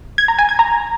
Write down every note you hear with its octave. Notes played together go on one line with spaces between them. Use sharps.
G#6
A#5
G#5
G#6
A#5